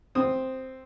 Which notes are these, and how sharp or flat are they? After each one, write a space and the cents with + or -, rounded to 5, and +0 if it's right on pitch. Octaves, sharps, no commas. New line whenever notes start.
C4 +0 D#6 +0